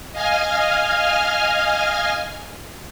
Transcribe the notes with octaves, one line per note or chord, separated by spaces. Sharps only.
D#5 F5 G#5 F6